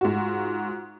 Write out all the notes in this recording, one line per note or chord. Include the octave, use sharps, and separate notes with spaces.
G#2 F4 F#4